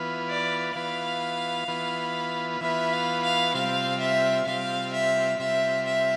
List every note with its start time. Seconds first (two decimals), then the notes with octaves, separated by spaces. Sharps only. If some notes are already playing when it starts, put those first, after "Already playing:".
Already playing: E3 B3 F4 B4
0.29 D5
0.75 E3 B3 F4 B4 F5
1.68 E3 B3 F4 B4
2.61 E3 B3 F4 B4 E5
2.92 F5
3.23 F5
3.54 C3 G3 C4 F4 F5
4.00 E5
4.46 C3 G3 C4 F4 F5
4.93 E5
5.40 C3 G3 C4 F4 E5
5.86 E5